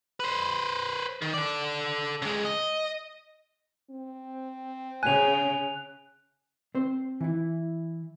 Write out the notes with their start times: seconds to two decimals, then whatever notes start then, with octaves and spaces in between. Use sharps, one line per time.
0.20 B4 C5
1.22 D#3
1.34 A4 D5
2.22 C#3 G#3
2.45 D#5
3.90 C4
5.03 C#3 G#5 F#6 F7
6.75 C4 C5
7.21 E3 E4